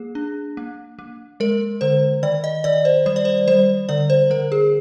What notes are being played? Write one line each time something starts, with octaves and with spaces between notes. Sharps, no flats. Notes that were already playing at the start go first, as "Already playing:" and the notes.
Already playing: A#3 G#4
D4
A#3
A#3
G#3 A#4
D3 C5
D#3 D5
D#5
D#3 D5
C5
G3 C5
D5
C5
G3 C5
D3 D5
C5
D3 A#4
G#4